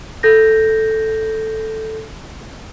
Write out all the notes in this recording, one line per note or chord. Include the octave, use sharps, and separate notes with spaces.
A4 G6 A#6